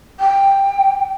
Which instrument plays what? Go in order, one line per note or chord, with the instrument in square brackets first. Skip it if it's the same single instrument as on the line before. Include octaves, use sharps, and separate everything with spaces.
[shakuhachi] G5